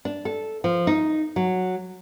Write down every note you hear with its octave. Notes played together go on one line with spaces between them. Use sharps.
D4
A4
F3
D#4
F#3